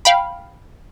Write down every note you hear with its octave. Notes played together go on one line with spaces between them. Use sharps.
F5 G5 B5